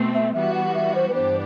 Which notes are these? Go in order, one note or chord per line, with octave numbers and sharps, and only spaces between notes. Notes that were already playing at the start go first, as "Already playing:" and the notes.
Already playing: B2 A3 C4
E5
E3 G3 B3 F#4 E5
F#5
E5
C5
B4
G2 E3 B3 D4 G4 C5